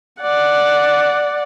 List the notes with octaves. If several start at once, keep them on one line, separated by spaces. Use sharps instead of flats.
D5 F#5